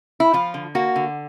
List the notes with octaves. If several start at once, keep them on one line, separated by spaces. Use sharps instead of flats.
E4
F3 F4
D3
A#3 F#4
D3